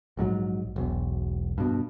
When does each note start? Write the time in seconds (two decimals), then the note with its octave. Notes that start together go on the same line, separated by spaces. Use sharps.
0.17 A#1 G#2 B2 F#3
0.76 E1 B1
1.58 G2 B2